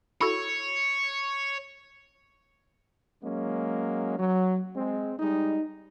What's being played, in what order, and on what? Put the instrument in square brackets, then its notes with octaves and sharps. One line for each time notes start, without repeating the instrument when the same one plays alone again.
[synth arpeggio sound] E4 F#4 A4 [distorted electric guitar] C#5
[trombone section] F#3 G#3 A#3 C#4
F#3
G#3 C4
G3 G#3 D#4